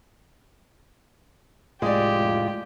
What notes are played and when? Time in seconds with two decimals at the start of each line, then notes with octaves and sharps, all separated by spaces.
1.82 F1 A2 G#3 F4 G4 D5